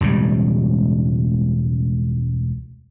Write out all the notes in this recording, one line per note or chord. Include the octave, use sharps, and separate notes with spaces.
E1 C#2 A2 G3